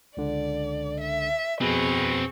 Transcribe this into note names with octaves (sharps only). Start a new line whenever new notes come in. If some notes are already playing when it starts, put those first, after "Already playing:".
C#2 D3 D5
E5
F2 B2 C4 G#4 B4 C#6